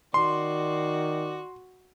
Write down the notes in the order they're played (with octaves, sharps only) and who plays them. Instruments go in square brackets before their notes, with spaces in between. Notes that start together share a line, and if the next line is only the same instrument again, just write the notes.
[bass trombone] D#3 [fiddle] F#4 [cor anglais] D5 [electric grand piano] C6